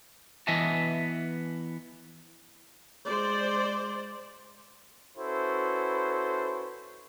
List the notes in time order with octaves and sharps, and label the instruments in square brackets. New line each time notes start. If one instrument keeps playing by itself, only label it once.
[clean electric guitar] E3 B3 D#5 E5 G#5 A5
[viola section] G#3 C5 D5
[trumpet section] C#4 E4 F#4 A4 B4 C5